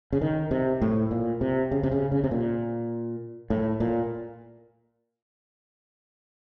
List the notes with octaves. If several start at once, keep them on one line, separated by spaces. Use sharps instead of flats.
C#3
D#3
C3
A2
A#2
C3
C#3
C3
C#3
C#3
C3
A#2
A2
A#2